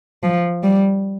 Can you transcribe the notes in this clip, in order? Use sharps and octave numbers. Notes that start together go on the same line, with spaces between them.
F3
G3